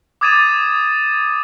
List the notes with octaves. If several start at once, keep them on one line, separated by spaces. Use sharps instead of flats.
D6 D#6 G#6 A6 D#7 E7